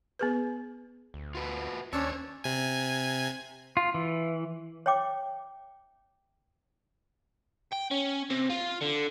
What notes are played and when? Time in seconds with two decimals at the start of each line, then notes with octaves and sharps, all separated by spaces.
0.19 B3 G#4 B4
1.14 D2
1.35 F4 F#4 B4
1.93 D#2 C#4 D4 C5 C#5 A5 E6
2.44 C3 G#5
3.77 F4
3.94 E3
4.86 C#5 E5 G5 D6
7.73 G5
7.91 C#4
8.30 C3
8.50 F4
8.81 D3